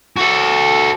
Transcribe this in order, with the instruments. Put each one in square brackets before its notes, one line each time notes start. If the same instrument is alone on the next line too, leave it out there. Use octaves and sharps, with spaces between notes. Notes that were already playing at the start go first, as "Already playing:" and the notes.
[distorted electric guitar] F#4 A4